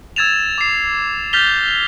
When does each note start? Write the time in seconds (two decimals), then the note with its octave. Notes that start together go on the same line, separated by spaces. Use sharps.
0.16 E6 G#6 A6 E7 F7
0.58 D6 C7
1.33 F6 G6 A6 B6 F7 G7